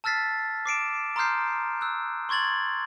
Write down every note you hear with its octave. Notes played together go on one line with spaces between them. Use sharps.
A5 E6 F6 A6 B6 C7
D6 C7 D7 E7
A#5 C6 D#6 F6 G6 C7
E6 F#6
C6 C#6 G#6 A6 F#7